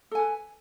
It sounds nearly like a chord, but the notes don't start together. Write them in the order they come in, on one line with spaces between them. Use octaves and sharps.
A4 G#5 B4